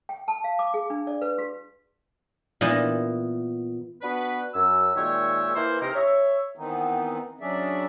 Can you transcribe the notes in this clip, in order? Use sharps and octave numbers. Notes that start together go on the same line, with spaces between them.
G5
A5
F5
D6
G#4
D4
D5
B4
F#4
A#2 E3 B3 D#4
B3 D4 F#4 B4
F#2 E6
A#2 D#3 G#3 C#5 E5 G5
E3 A#3 C5
C3 D#4 A#4
C#5 E5
D#3 E3 B3 C4 D#4
F#3 C#4 D4 G#4 D5 E5